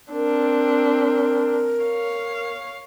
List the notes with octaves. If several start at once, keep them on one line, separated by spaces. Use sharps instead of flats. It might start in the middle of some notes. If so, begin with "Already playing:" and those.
C4 D4 A#4
C#5 F5